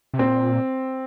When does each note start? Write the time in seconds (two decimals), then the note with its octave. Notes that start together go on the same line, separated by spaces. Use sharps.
0.14 C3
0.19 A#2 C4